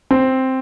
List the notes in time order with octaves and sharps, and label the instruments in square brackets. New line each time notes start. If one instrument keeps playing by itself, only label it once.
[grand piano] C4